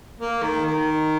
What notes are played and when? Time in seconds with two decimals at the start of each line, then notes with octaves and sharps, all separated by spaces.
0.20 A#3
0.43 D#3
0.65 D#3